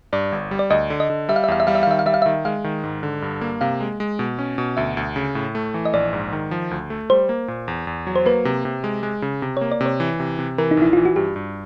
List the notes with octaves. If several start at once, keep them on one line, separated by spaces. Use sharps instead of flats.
G2 D5
G1
G3
D5
D2 D#5
D3
D#5
D3
G3 E5
F5
E5
E2 F5
E5
G3 F5
E5
F5
D#3 E5
F5
G3 E5
F5
D#3 E5
G#3 F5
D#3
G#2
D3
G2
A#3
C3 F5
G#3
G#3
B2
C#4
B2
D2 E5
D2
C#3
A2
A3
E3
D#5
A#1 D5
G#2
D#3
F3
D2
A3
G3 C5
A#3
A#2
E2
E2
F#3
C5
A#3 B4
C3
C3
G#3
G#3
C#3
C3
A#3 C#5
D5
C3
C#5
E3
C3
C3
E3 A#4
D#4
A#1 E4
E3 F4
F#4
G2 G4
G2